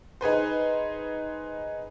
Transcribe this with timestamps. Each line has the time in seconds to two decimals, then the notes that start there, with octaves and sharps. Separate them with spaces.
0.21 D#4 G#4 B4 C5